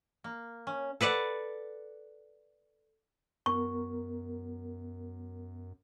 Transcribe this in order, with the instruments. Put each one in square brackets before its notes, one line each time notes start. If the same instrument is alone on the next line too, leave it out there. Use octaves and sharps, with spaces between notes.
[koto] A#3
C#4
A4 B4 D5 F#5
[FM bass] F#2 [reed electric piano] B3 A#4 [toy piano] C#6